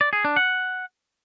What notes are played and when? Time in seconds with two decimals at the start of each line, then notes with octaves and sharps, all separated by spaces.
0.01 D5
0.13 G#4
0.25 D4
0.36 F#5